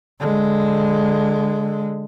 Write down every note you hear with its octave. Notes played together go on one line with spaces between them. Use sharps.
D3 G#3